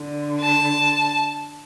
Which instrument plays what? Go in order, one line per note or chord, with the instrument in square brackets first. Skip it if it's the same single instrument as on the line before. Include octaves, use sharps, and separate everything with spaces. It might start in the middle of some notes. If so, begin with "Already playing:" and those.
Already playing: [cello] D3
[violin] A5